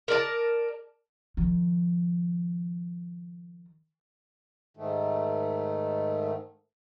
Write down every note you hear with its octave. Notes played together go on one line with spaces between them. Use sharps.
A#4 D5 A5
D#3 F3
G#2 D#3 A3